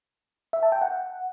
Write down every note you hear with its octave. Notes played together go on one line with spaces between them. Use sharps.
E5
A5
G5
F#5